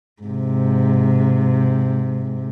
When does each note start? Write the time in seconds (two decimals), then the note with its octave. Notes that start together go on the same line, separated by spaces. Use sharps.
0.23 G#2 C3